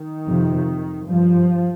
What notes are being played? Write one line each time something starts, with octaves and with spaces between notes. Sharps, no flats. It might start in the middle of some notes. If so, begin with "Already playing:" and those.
Already playing: D#3
F2 C3
G2 F3